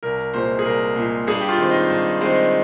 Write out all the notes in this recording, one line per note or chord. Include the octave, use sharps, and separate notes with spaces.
C2 A#4
A#2 G#3 C5
G#4
C2 A#4
A#2 G#3
G2 G#4
G4
F4
D#3 G#3 C4
D#4
G2
D#3 G#3 C4